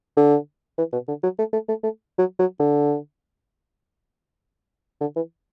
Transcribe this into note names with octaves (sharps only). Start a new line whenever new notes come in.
D3
E3
B2
D3
F#3
A3
A3
A3
A3
F#3
F#3
D3
D3
E3